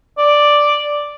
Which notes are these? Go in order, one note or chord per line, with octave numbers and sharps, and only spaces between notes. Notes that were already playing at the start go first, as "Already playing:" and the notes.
D5